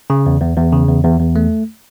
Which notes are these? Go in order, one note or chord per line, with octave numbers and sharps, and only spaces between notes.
C#3
E2
E2
E2
C#3
E2
E2
E2
A3